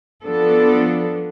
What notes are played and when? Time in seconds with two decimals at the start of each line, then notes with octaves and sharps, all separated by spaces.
0.23 F3 B3 D4 A4